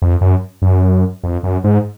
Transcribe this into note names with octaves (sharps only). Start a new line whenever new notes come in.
F2
F#2
F#2
F2
F#2
G#2